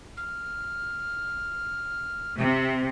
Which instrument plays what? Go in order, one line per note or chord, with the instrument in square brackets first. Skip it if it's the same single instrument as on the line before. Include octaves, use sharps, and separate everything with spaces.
[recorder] F6
[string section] C3 [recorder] E5